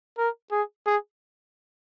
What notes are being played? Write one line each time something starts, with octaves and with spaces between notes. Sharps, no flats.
A#4
G#4
G#4